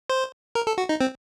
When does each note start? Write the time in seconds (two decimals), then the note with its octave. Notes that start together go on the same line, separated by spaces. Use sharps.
0.10 C5
0.55 A#4
0.67 A4
0.78 F#4
0.89 D#4
1.01 C4